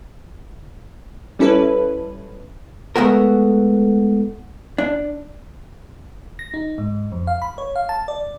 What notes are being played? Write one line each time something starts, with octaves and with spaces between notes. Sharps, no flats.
G3 C#4 E4 A4 B4
G#3 A3 B3 F#4 A#4
D4
A#6
D#4
G#2
F2
F5
B5
C#5
F5
A5
D5